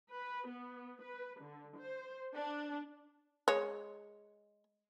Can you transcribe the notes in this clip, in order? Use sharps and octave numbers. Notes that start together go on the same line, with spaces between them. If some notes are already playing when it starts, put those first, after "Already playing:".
B4
B3
B4
D3
C5
D4
G#3 C#5